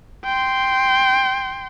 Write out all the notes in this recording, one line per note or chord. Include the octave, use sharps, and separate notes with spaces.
G5 C6